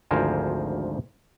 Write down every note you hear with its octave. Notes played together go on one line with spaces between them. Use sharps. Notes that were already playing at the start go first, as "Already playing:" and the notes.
G#1 D2 F3 A#4 C5 G#5